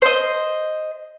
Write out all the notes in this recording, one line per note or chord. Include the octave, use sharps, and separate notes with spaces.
C5 D#5